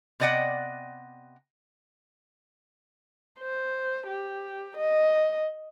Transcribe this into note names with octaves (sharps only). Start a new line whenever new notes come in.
C3 B3 D5 D#5 F#5 G5
C5
G4
D#5